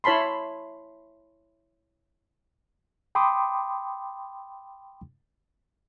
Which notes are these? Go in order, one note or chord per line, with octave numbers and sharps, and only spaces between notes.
E4 C#5 A5 B5 C6
G5 B5 C6 D6 D#6